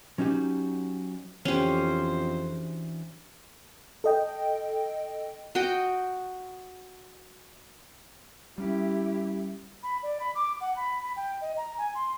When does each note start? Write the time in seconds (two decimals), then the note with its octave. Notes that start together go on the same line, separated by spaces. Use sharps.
0.18 F#3 C#4 D#4 F#4 G4
1.45 F2 E3 C#4 D4 F#4 G4 C5
4.04 A4 D#5 G5
5.55 F#4 D#5 G5
8.58 G3 C#4 E4 G4
9.83 B5
10.03 D5
10.20 B5
10.35 D6
10.61 F#5
10.77 B5
11.03 B5
11.16 G5
11.41 D#5
11.57 A#5
11.78 G#5
11.95 C6